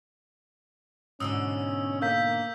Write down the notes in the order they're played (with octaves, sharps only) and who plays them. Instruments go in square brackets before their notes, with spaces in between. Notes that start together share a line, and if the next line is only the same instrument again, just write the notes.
[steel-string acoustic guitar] G#2 B2 D3 [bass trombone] C#4 [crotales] D#6 E6
[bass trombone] A#3 [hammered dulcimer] F5 A#5 [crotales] E6 G6 B6